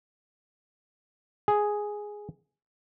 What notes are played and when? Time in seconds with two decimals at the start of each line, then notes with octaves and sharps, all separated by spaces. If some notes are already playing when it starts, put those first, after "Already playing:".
1.48 G#4